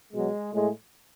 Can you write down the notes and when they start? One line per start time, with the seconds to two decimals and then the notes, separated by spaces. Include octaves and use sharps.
0.12 B2 F#3 G#3
0.53 A2 G#3